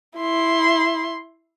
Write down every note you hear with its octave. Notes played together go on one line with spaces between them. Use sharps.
E4 C6